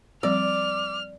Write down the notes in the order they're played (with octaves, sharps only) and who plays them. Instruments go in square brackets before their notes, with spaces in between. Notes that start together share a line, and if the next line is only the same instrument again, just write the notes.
[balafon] F3 G3 C4 [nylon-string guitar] D5 [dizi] D6 [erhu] F6